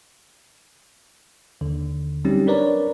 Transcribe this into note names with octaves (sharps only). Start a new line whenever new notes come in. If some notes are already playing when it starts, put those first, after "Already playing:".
D#2 D3
F#3 G3 C4 C#4 D#4 G4
D4 A#4 B4 C#5 D5 A#5